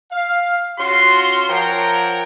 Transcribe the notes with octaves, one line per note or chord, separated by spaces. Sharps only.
F5
C#4 F4 F#4 C6
F3 A#4 C#5 F#5 G5 A#5